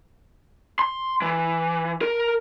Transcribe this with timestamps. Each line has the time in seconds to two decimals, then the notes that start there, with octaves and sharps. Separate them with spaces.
0.79 C6
1.22 E3
2.01 A#4